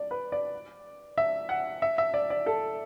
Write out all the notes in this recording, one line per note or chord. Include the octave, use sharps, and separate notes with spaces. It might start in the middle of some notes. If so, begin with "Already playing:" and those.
Already playing: D5
B4
D5
E5
F#5
E5
E5
D5
D5
A4